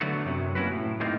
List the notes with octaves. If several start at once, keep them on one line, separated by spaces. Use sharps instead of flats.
D3 F#3 A3 B3 F#4
F#2 C3 F#3
A#3 C#4 E4 F#4 B4
A2
A2 G#3 A#3 C4 D#4 F4